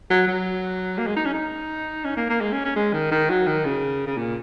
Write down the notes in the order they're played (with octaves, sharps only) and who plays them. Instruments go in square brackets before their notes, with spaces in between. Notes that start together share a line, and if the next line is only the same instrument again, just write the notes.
[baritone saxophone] F#3
F#3
A#3
G#3
D#4
C#4
D#4
C#4
A#3
A#3
G#3
C#4
C#4
G#3
D#3
D#3
F#3
D#3
C#3
C#3
A#2